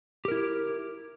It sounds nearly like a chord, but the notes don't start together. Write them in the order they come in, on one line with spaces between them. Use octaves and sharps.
G4 A#4 E4